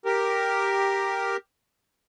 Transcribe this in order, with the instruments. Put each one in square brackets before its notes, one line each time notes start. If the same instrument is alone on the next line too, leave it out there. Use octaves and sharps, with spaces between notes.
[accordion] G4 A#4